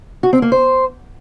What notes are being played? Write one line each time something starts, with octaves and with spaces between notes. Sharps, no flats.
F#4
C4
A#3
C5